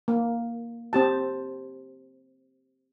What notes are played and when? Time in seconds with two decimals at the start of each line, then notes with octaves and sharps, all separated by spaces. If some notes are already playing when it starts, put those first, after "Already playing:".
0.08 A#3
0.93 C4 G4 A5